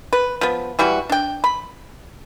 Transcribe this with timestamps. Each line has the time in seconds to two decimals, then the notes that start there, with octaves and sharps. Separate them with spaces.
0.13 B4
0.41 F3 B3
0.79 E3 G3 E4 F#4
1.10 D4 G5
1.44 B5